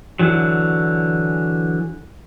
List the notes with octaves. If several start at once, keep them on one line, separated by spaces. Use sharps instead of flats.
D3 E3 F#3